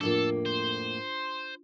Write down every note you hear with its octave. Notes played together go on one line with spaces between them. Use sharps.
F2 A2 A#3 D4 F4 A4
C5